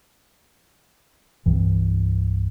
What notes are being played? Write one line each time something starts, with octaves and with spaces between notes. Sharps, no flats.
C2 G2 E3